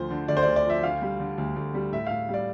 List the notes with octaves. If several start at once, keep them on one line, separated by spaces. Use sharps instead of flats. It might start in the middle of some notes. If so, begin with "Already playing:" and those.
Already playing: D2 F3 C5
D3
D2 D5
C5
D2 D5
D5
F3 E5
D2 F5
G3
D3
D2
D2
G3
A2 E5
A2 F5
G3 D5